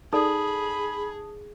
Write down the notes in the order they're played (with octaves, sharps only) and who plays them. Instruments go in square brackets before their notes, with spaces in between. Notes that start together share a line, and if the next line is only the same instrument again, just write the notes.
[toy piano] D#4 A4 D5 [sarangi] G#4 [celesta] A5 D#6 [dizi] B5